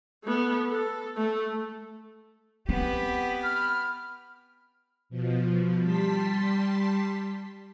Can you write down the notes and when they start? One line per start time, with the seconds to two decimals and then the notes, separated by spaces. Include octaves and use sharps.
0.24 A3 B3
0.71 A4
1.17 A3
2.69 B3 C4 G4
3.43 B5 F6
5.09 B2 F3
5.79 G3 A5 C6 B6